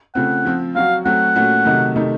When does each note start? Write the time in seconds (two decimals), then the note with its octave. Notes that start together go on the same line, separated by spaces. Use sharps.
0.15 C#3 A3 C4 F4 F#5
0.45 F3 C4 F4
0.75 F#3 C4 F#4 F5
1.05 F#3 A3 C4 F#4 F#5
1.36 A#2 A3 C#4 F#4
1.65 C3 D#3 F#3 A3 D#4
1.96 C3 D#3 A3 D#4